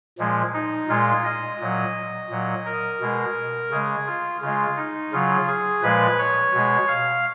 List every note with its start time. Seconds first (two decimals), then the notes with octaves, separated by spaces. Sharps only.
0.18 A#2 F3 G#3
0.53 D#4
0.88 A#2 G#3 F4
1.24 D#5
1.60 A#2 F#3
2.30 A#2 F#3
2.65 A#4
3.00 B2 G#3
3.70 C#3 G#3 G#4
4.06 F4
4.41 C#3 G#3 F4
4.77 D#4
5.12 C#3 F#3 F4
5.47 G#4
5.82 A#2 F3 G#3 B4
6.18 C#5
6.53 B2 G#3
6.88 F5